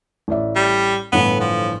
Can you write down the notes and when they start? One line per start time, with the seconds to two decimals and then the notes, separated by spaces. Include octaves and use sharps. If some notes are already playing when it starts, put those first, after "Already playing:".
0.28 A1 D5 E5
0.56 G3
1.12 G1 A2 E3 B3
1.40 F3